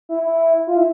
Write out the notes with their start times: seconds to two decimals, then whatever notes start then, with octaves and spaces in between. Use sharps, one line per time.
0.09 E4
0.23 E4
0.67 F4
0.77 E4